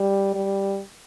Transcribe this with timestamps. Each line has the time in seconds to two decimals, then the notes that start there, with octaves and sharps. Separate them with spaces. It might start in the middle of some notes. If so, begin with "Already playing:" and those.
Already playing: G3
0.35 G3